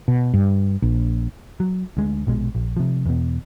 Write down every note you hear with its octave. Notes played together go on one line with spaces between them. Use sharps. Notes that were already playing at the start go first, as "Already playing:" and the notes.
B2
G2
A#1
F#3
D2 G#3
A#1 B2 G#3
A#1
C3 F3
E2 B2